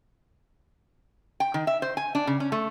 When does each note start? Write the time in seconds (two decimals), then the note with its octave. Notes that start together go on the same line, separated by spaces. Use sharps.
1.40 G5
1.54 D#3
1.67 E5
1.82 C5
1.97 G#5
2.15 D4
2.27 C#3
2.40 C#4
2.52 A3